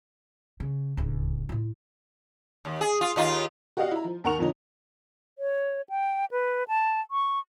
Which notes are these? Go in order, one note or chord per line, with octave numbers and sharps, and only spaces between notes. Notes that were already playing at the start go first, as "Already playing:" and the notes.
C#3
D1 C#2
A2 F4
D#2
G#4
F4
D#2 D#4 F4
F#4 G4 D5 D#5 F5 F#5
E4 A#5
F3
D#2 A#4 F#5 C#6 F7
F2 A#2 D3 F3 C#4 D#4
C#5
G5
B4
A5
C#6